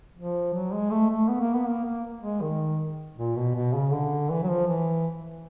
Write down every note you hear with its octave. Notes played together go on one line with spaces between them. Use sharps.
F3
F#3
G#3
A3
A3
B3
A#3
B3
A#3
A#3
G#3
D#3
A#2
B2
B2
C#3
D3
E3
F#3
F3
E3